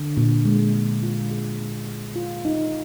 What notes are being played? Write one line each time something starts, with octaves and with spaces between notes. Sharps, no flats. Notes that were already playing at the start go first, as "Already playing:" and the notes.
Already playing: D3
A#2
G#3
G#3
F4
G#4
A#3
G#4
F4
D#4